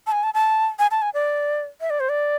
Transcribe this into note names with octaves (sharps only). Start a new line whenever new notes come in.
A5
G#5
A5
A5
G#5
A5
G#5
D5
E5
D5
C5
D5